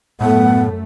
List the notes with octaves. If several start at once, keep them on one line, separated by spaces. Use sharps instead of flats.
F#2 A2 A3 B3 F#5